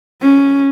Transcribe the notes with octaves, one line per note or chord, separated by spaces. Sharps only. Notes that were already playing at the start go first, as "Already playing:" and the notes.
C#4